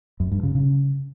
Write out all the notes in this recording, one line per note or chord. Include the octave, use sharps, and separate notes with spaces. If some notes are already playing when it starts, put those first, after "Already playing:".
F#2
G2
C#3
C#3